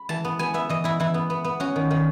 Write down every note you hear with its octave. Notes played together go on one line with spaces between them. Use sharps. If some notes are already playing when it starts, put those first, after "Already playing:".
Already playing: B5
E3 A5
B3
B3 G#5
B3 E5
E3 D#5
E3 E4
E3 E4
B3
B3
B3
C#4 F#4
D#3
D#3